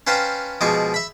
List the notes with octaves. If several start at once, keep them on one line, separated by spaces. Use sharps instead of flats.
C#4 B4 C5 F5 G5 A5
B2 F3 G#3 G#4 C#6 D6
E5 B5